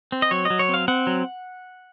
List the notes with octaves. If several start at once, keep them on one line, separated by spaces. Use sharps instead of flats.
C4
D#5
F#3 C#5
D#5
F#3
C#5
C4 F5
C4 F#5
F#3